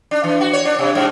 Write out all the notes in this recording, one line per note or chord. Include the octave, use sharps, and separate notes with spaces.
D4
E3
F#4
C#5
D4
C3
G#2